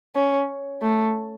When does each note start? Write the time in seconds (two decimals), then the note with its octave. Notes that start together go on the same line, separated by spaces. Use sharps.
0.15 C#4
0.82 A3